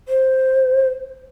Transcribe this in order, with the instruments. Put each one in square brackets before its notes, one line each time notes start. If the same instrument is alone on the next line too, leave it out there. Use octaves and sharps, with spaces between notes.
[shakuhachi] C5